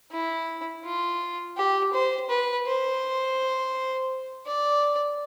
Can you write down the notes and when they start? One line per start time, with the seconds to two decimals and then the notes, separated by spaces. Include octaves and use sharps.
0.12 E4
0.84 F4
1.57 G4
1.93 C5
2.29 B4
2.67 C5
4.46 D5